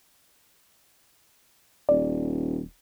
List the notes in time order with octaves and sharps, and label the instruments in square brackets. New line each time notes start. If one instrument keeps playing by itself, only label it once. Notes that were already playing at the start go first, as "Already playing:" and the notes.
[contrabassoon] D#1 [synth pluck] D5